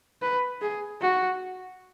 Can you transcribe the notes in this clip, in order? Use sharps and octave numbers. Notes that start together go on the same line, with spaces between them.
B4
G#4
F#4